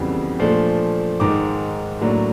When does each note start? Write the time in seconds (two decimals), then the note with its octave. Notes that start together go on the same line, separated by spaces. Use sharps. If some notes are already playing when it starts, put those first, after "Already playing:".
Already playing: F2 C#3 E3 G3 B3
0.39 A#2 F3 A3 D4
1.20 G#2 D#3 G#3 D6
2.01 A2 F#3 A#3 D4